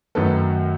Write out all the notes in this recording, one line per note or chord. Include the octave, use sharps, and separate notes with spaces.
F#2 D#3 F#3 A3 A4 B4